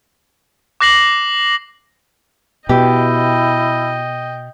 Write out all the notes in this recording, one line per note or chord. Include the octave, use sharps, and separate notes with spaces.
D6 F#6 A#6 C7 F#7
B2 E4 G4 D#5 G5